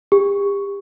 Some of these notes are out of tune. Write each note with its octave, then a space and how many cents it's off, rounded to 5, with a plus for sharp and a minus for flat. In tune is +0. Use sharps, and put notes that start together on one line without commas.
G4 +35